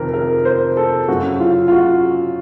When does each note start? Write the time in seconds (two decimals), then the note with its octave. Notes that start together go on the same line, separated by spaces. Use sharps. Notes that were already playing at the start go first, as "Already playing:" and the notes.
Already playing: F2 C3 D#3 A#4
0.13 A#4
0.45 C5
0.77 A4
1.08 F#2 C#3 F#4
1.40 F4
1.68 F4
1.71 F#4